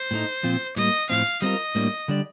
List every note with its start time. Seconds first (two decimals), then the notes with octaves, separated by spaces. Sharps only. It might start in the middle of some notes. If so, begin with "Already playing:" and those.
Already playing: C5
0.11 A2 A3 D#4
0.43 A#2 F3 C4 F4
0.76 A2 G3 A#3 D#5
1.10 A2 F3 C4 F5
1.42 G3 C4 F4 A#4 D#5
1.75 A2 G3 A#3 D4
2.08 D3 G3 D4 G4 D5